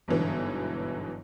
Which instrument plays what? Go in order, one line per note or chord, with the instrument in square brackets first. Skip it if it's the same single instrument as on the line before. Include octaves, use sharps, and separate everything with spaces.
[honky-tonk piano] G1 G#2 B2 D3 E3 F#3